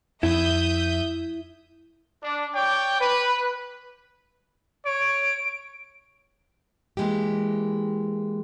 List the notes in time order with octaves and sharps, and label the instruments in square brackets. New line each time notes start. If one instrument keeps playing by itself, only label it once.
[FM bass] F2 [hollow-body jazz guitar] E4 [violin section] E5 D#6 G6
[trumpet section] D4
C#5 D5 G5 D6
B4
[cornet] C#5 [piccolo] D7
[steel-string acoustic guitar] E3 G#3 A#3 G4